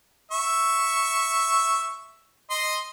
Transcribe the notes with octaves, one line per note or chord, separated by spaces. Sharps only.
E5 C#6
D#5 C6